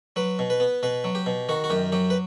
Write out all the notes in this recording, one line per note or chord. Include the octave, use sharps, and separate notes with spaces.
F#3 B4
B2
B4
B3
B2 B4
F#3
G4
B2
D#3 F#4
F#4
F#2 G4
F#3 G4
B4